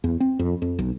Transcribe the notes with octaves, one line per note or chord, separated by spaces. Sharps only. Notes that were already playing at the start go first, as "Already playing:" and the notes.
E2
C4
F2
F2
B1